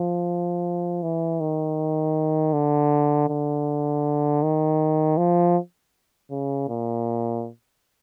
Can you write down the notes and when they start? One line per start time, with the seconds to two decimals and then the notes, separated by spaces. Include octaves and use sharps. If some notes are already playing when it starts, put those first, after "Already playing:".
Already playing: F3
1.02 E3
1.40 D#3
2.53 D3
3.29 D3
4.42 D#3
5.17 F3
6.31 C#3
6.69 A#2